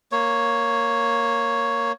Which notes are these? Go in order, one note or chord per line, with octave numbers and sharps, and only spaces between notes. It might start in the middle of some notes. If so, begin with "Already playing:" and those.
A#3 C#5